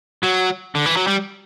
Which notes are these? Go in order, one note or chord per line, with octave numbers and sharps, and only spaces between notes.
F#3
D3
E3
F#3
G3